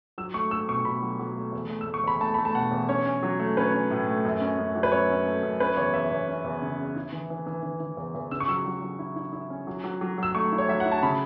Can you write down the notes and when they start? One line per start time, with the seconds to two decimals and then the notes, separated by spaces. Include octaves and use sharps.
0.18 F#3 E6
0.34 A3 C#6
0.51 A3 E6
0.68 B2 C#6
0.85 B2 B5
1.02 F#3
1.19 F#3
1.36 A3
1.53 E2
1.70 A3
1.81 E6
1.87 A3
1.94 C#6
2.04 E2 B5
2.21 A3 A5
2.34 A3 B5
2.45 A5
2.55 B2 F#5
2.72 E2
2.89 C#4 C#5
3.06 C#4
3.23 F#3
3.40 A3
3.57 C#4 B4
3.74 C#4
3.91 A2
4.08 A3
4.25 F#2
4.41 C#4
4.59 F#2
4.75 F#3
4.83 B4
4.92 F#2 C#5
5.09 C#4
5.26 A3
5.43 F#2
5.60 C#4 B4
5.77 E2 C#5
5.94 E2 E5
6.11 E2 C#5
6.28 C#4
6.45 E2
6.62 C#3
6.79 C#4
6.96 E4
7.13 E3
7.30 E3
7.47 E3
7.63 E3
7.80 E3
7.97 E2
8.15 E2
8.31 C#3 E6
8.40 C#6
8.48 F#3 E6
8.66 F#3
8.82 F#3
8.99 E4
9.16 E4
9.33 E4
9.50 C#4
9.67 F#3
9.84 F#3
10.01 F#3
10.18 F#3 E6
10.35 A3 C#6
10.52 E4
10.58 C#5
10.69 F#3 E5
10.80 F#5
10.85 E4
10.91 A5
11.02 C#3 B5